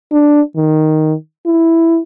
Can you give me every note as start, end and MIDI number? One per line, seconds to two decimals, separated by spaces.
0.12 0.41 62
0.56 1.14 51
1.46 2.00 64